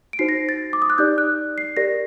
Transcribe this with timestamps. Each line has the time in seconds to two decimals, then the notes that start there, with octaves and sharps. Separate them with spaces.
0.13 D7
0.19 D#4 F#4 C5 C7
0.29 A#6
0.49 A6
0.73 D6
0.82 D#6
0.90 F#6
0.98 D#4 G4 D5 G6
1.18 F#6
1.58 C7
1.77 G4 A#4 D5 A#6